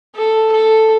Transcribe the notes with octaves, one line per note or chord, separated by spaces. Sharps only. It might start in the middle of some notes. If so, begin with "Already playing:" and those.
A4
A4